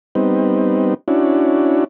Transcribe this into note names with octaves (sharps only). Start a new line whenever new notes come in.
G3 B3 C4 D#4
C#4 D4 E4 F#4